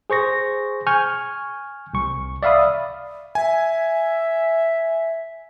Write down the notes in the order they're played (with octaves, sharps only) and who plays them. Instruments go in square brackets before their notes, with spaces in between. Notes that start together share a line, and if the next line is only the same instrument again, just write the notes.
[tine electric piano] G#4 C5 C#6 A#6
G#5 C#6 F6 G6
C2 C#6
D5 E5 F5 B5 D#6
[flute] E5 [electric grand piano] G#5